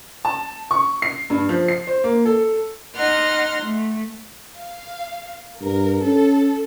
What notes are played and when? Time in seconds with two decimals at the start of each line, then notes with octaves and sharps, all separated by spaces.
0.25 A5
0.71 C#6
1.02 C7
1.30 G2
1.49 F3
1.68 C7
1.87 C5
2.04 A#3
2.25 A4
2.95 D#4 F#5 C6 F6
3.63 A3
4.58 F5
5.62 G2 A#4
6.02 C#4 A4